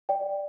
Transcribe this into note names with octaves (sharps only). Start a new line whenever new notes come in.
D5 G5